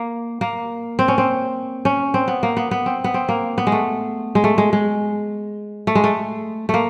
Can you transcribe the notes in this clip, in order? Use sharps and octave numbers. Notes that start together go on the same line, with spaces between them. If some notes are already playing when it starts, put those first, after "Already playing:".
Already playing: A#3
A#3
C4
C#4
C4
C#4
C4
B3
A#3
B3
B3
C4
B3
C4
A#3
B3
G#3
A3
G#3
A3
G#3
G#3
A3
G#3
A3
A3 A#3